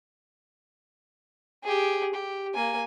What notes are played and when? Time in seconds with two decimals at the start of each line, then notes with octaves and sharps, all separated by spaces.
1.64 G4 G#4
2.14 G4
2.55 A#3 G#5